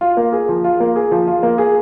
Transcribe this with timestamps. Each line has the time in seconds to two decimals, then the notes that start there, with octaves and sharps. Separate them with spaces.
0.01 F4
0.17 A#3
0.32 G#4
0.49 F3
0.64 F4
0.80 A#3
0.96 G#4
1.12 F3
1.27 F4
1.43 A#3
1.58 G#4